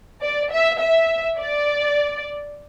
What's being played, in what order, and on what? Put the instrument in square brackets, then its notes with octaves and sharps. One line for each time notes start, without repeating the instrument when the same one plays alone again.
[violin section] D5
E5
E5
D5